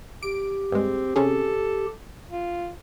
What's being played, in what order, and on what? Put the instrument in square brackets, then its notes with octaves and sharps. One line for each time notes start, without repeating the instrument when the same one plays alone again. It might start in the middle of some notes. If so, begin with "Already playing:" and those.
[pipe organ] G4 [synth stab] D7
[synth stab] G2 G#3 [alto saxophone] C4
[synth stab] C3 C#4 G#4 [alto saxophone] A4
[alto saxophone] F4